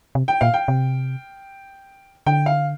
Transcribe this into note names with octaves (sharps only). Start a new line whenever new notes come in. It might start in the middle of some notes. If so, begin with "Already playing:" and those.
C3
G5
A#2 F5
G5
C3
D3 G5
F5